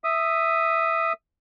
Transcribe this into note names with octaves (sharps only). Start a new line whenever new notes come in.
E5 D#6